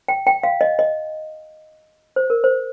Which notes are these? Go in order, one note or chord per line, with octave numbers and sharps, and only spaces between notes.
G5
G5
F5
D#5
D#5
C5
A#4
C5